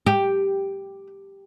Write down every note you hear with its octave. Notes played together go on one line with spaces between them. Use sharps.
G4